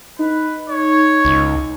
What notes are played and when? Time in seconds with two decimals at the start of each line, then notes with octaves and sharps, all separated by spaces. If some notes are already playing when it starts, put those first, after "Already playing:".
0.19 D#4 B4
0.69 C#5
1.25 C#2